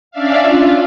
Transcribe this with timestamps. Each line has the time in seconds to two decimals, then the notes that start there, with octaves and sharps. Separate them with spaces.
0.11 C#4 D4 D5 E5 F5
0.42 F4